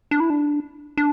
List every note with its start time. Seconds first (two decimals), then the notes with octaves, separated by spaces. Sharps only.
0.11 D4
0.20 E4
0.30 D4
0.97 D4